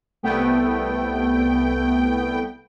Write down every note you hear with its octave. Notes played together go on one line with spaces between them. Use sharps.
C2 A3 B3 G5